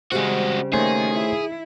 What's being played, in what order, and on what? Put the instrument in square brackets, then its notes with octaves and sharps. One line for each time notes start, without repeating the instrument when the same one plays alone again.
[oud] C#3 G3 C4 [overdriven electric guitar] G#3 F#4
[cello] D#3 A#3 [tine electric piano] A3 C5 C#5 [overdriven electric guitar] G#4
[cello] E4